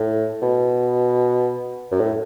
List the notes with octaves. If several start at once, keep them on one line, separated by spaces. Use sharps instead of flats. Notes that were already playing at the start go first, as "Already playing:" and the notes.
Already playing: A2
B2
F#2
A2